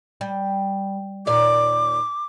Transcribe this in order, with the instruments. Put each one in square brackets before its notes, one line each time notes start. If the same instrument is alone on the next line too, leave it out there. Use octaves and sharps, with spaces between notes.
[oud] G3
[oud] D#2 A#2 D5 [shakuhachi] D6